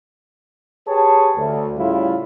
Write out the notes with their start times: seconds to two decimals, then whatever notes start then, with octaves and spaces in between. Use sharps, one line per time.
0.87 G4 G#4 B4 C#5 A5
1.36 D2
1.77 A2 C#3 G3 E4 F4